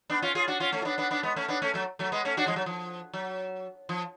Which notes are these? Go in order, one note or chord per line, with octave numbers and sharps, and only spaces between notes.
B3 D4
C#4 F4
F4 G#4
D4 F#4
C#4 F4
A3 C#4
F4
B3 D4
B3 D4
B3 D4
G#3 B3
A3 C#4
B3 D4
A3 C#4
F#3 A3
F#3 A3
G#3 B3
A3 C#4
D4 F#4
F3 G#3
F#3
F3
F#3
F3